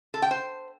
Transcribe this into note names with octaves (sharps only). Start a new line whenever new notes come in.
A4
G5
C5